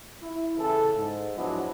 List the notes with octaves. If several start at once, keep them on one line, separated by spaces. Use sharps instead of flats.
E4
C#3 E3 A4
G#2
F3 F#3 G#3 B3 D4 E4